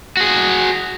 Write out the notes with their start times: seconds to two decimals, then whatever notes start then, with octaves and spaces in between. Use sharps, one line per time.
0.17 F#4 G#4